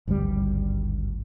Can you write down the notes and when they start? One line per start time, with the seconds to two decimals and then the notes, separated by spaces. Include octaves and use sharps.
0.07 G#1 D2 G2 G3